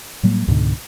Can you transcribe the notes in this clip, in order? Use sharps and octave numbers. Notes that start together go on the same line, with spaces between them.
A2 F#3 G3 A#3
C#2 G#2 B2 D3